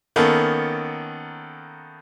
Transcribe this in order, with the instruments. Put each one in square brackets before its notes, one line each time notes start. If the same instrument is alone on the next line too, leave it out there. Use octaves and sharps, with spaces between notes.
[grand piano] D#3 A#3 B3 C#4 A4